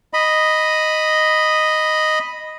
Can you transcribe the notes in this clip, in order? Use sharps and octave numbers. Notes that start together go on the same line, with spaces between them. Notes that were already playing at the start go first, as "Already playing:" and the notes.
D#5 B5